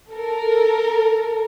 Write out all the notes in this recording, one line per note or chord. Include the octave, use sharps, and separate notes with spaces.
A4 A#4